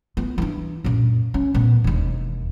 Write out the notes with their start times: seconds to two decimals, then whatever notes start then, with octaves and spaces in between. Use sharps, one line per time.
0.17 B3 F4
0.38 E3 D4
0.84 F#2 A#2
1.34 C#4
1.54 A#2 B3
1.84 E1 D#2